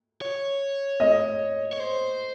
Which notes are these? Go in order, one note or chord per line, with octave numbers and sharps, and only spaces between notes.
C#5
D#5
C#5
C5